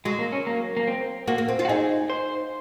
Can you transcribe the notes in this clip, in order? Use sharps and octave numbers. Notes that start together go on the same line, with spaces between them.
F#3 G#3
A#3
C#4
A#3
A#3
C4
A#3 F#4
A#3
C4
F4
F#4
D#4 G#4
C5